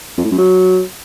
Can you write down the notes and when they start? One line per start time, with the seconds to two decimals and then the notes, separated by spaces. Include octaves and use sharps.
0.17 F2
0.24 A2
0.31 F#2
0.38 F#3